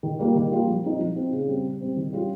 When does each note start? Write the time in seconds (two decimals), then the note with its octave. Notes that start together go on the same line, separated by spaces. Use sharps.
0.03 D#3
0.19 G3 A#3 F4
0.35 D#3
0.51 G3 A#3 F4
0.67 F3
0.84 C4 D#4
1.00 F3
1.16 C4 D#4
1.32 C#3
1.48 G3 C4
1.64 C#3
1.81 G3 C4
1.96 D#3
2.13 G3 C#4 F4